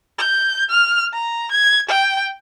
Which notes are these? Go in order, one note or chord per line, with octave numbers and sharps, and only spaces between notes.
G6
F6
A#5
G#6
G5